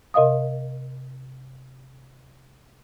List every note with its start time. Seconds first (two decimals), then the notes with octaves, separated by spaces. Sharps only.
0.14 C3 A#4 D#5 F5 D#6